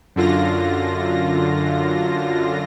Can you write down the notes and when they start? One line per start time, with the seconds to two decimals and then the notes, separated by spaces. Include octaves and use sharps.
0.16 F#2 D3 F4 A#6